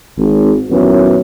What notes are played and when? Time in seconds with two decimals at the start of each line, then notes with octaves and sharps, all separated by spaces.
0.18 G#1
0.70 D#2 A#2 E3 F#3 B3 C#4